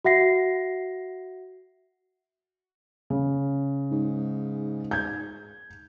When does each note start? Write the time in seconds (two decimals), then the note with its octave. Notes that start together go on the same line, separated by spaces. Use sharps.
0.05 F#4 E5 F#5 A#6 C7
3.10 C#3
3.91 G#2
4.91 G6 G#6